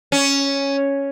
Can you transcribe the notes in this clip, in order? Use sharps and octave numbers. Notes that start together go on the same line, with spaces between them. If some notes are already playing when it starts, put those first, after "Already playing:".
C#4